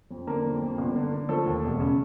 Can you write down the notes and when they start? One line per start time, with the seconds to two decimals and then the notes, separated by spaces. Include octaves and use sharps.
0.11 F2
0.27 D3 A#3 A#4
0.45 F2
0.61 F2
0.78 G1
0.96 D3
1.12 D3
1.29 F3 A3 A4
1.46 D#2
1.63 E1
1.80 C#3